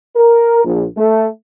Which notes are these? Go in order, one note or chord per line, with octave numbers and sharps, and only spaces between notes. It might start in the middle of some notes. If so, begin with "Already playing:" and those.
A#4
A#1
A3